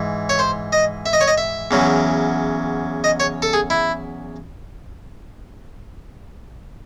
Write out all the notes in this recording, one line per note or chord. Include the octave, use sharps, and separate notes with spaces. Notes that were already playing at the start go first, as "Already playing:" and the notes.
Already playing: G#2 E3
C#5
C5
D#5
E5
D#5
C#5
D#5
E5
E2 C#3 F#3
D#5
C#5
A4
G#4
E4